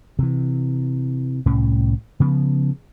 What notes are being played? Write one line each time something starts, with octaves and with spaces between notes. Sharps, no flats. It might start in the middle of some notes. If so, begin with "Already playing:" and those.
C3 E3
C2 A2 C#4
C#3 F3 B3